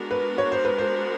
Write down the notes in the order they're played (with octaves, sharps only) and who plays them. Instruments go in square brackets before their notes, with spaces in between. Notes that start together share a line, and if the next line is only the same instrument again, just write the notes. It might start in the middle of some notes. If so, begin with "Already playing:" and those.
Already playing: [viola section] G#3 B3 D4 F#4 A#4
[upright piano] B4
C#5
C5
B4
C5